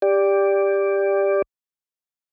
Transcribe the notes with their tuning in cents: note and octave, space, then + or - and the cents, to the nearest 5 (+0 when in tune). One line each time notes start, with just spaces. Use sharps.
G4 +15 D5 -5